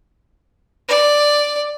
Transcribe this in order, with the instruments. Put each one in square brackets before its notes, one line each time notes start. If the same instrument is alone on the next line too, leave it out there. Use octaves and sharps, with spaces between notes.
[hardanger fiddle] D5